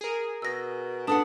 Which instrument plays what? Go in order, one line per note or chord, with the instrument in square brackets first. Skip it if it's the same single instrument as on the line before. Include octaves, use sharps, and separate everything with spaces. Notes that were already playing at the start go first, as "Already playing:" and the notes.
[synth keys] G#4 A#4
[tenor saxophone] B2 [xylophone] E6 A#6
[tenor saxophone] B3 [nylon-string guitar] D4 A4 F#5 [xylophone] A5 D#6